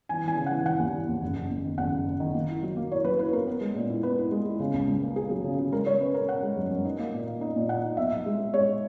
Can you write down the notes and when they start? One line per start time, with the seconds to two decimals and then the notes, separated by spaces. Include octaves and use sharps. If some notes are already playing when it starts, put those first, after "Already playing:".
0.09 E3 G#5
0.24 E3 G#5
0.37 C#3
0.46 F#5
0.52 E3
0.66 E3 F#5
0.79 D#2
0.94 E3
1.08 D#2
1.22 F#1
1.36 F#1
1.50 F#1
1.65 D#3
1.78 F#1 F#5
1.92 F#1
2.07 F#1
2.20 D#3
2.34 A#3
2.48 E4
2.63 F#3
2.77 A#3
2.91 E4 C#5
3.05 F#3 B4
3.19 E4 B4
3.33 A#3 A#4
3.47 B3
3.61 G#3
3.75 A#2
3.90 E4
4.03 B3 B4
4.18 E4
4.31 G#3
4.45 E4
4.60 C#3
4.74 C#2
4.88 C#2
5.02 A#3
5.16 A#3 G#4
5.30 F#3
5.44 C#3
5.58 C#3
5.72 G#3 A#4
5.86 G#3 C#5
6.01 C#4 B4
6.14 C#4 A#4
6.29 C#4 F#5
6.43 G#3
6.57 F#2
6.71 F#2
6.85 D#4
6.99 A#3
7.13 A#2
7.27 A#3
7.41 D#4
7.56 A#2
7.69 A#2 F#5
7.84 D#4
7.97 B1 E5
8.11 B1
8.26 G#3
8.40 G#3
8.54 G#3 C#5